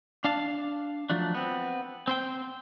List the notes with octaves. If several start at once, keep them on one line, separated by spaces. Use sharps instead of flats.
D4 F5 A5
F3 F#3 A3 D4
B3 C4
C4 C5 G5